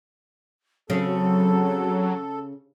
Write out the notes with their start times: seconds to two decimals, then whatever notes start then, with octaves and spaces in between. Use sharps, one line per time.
0.90 C#3 F#3 C4 A4